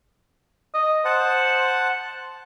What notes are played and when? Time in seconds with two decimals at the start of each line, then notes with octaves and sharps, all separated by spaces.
0.74 D#5
1.05 C5 F#5 A5